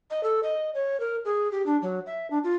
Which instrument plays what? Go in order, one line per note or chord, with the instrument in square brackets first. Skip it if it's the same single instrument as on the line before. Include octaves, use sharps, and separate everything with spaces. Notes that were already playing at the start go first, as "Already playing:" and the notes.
[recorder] D#5
A4
D#5
C#5
A#4
G#4
G4
D4
F#3
E5
D4
F4